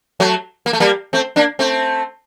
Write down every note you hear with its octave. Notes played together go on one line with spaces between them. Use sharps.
F#3 A3
A#3
A3
G3 A#3
A3 C4
A#3 D4
A3 C4